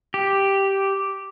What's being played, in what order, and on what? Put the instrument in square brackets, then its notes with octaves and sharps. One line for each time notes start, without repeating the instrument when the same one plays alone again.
[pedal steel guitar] G4